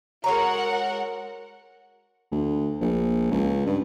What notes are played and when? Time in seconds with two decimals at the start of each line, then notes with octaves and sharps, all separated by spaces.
0.24 G#3 F#4 A#4 C#5 F#5 A#5
2.31 D2
2.81 A#1
3.31 C#2
3.66 G2